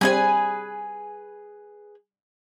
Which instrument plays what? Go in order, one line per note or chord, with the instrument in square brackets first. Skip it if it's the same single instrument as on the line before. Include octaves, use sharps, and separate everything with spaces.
[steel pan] G3 C4 [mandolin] G#4 B4 G#5